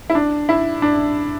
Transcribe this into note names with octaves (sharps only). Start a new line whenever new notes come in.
E4
D4
E4
D4